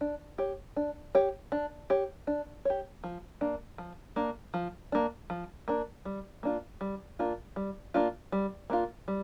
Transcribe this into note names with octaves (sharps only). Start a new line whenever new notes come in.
D4
G4 C#5
D4
G4 C#5
D4
G4 C#5
D4
G4 C#5
F3
A#3 D4
F3
A#3 D4
F3
A#3 D4
F3
A#3 D4
G3
A#3 D4 F4
G3
A#3 D4 F4
G3
A#3 D4 F4
G3
A#3 D4 F4
G3